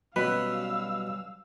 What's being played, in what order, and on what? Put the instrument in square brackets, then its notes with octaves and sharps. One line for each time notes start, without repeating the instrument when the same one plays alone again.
[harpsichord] B2 [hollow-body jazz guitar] F#3 G3 C#4 [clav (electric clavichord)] B4 [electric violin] F5 E6